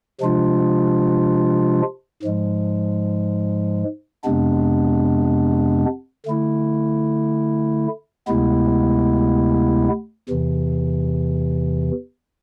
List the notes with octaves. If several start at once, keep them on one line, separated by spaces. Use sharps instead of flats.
C3 F3 G#3 D4 F4
G#2 F3 G#3
F2 C3 G#3 B3 D4
D3 A3 E4
D2 C3 G#3 B3 E4
E2 C3 E3